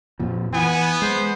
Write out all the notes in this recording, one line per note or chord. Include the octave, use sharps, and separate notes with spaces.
F2 A#2 F3
E3 B3 G#5
G#3 C5